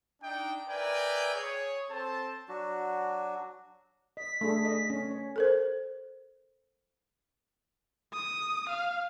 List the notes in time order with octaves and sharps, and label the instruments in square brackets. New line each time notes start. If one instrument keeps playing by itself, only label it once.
[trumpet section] D4 D#4 G5
A#4 B4 D5 E5 G5 G#5
G#4 C#5
C4 A4 C5 A5
[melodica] F#3 D4 F#4
[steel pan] D#5 [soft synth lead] B6
[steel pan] A3 D4 G#4
D#5
C#4
C#5
[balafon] A4 A#4 C5
[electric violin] D#6
F5